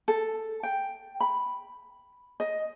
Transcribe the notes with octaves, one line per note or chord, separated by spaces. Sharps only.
A4
G5
B5
D#5